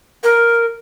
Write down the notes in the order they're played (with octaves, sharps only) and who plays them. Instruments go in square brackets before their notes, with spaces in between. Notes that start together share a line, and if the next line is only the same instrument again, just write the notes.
[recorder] A#4